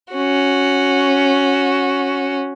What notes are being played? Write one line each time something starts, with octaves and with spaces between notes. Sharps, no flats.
C#4 F#4